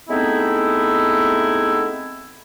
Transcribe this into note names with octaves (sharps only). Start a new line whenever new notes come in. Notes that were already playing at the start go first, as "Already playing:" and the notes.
G#3 A3 B3 C4 D#4 E4